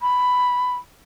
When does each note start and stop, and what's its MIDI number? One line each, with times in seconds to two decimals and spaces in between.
0.02 0.74 83